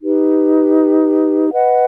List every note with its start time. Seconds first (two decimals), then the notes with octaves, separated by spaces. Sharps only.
0.02 D#4 G4 B4
1.50 B4 D#5 F#5